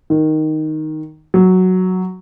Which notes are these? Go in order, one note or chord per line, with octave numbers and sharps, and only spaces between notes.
D#3
F#3